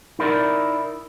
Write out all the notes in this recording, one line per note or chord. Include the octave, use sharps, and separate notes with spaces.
D#4 E4 A#4 D5